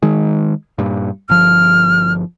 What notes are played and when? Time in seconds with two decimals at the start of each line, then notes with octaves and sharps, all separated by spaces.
0.02 D#3 G#3
0.78 G2 A#2
1.29 G1 F3 F6